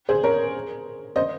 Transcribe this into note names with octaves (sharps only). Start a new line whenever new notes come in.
G#4 C5
A#4 C#5
C5 D#5